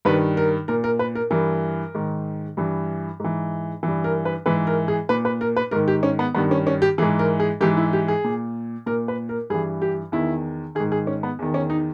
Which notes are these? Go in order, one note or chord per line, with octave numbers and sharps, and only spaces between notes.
G2 D#3 B4
A#4
A#2 A#4
A#4
B4
A#4
G2 E3 A#4
G#2 D#3
G2 E3
G#2 E3
G2 E3
A#4
B4
G#2 E3 B4
A#4
G#4
A#2 B4
B4
A#4
B4
G#2 D#3 A#4
G4
C#4
B3
G2 D#3 B3
C#4
C#4
G4
G#2 E3 G#4
A#4
G#4
G#2 E3 G4
E4
G4
G#4
A#2
A#2 A#4
B4
A#4
G2 E3 G#4
G4
E2 D#3 E4
G#2 D#3 G#4
G#4
C#4
B3
E2 D#3
C#4
D#4